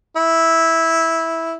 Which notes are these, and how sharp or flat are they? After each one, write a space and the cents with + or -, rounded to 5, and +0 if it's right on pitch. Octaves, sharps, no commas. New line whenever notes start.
E4 -10